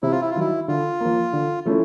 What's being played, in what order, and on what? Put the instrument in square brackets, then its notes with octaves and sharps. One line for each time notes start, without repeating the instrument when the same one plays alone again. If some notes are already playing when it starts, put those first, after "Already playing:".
[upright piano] C3 [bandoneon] E4
[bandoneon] F4
E4
F4
[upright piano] D#3 F#3 [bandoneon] E4
[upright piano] D3 [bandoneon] F4
[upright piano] F3 A#3
D3
F3 A3 C#4 E4